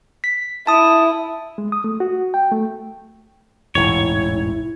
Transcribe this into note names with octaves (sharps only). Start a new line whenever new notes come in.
B6
E4 A5 D#6
G#3
D#6
A3
F#4
G5
A3
E1 A1 G#2 E4 C#5